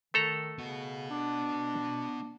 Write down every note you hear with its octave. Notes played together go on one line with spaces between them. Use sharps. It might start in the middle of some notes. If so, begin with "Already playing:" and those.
D#3 A3 A4 A#5
C#3 B3 F#4
D4